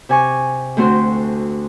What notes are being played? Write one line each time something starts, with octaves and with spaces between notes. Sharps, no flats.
C3 G#5 C#6
D2 A3 C4 F#4 A4 C6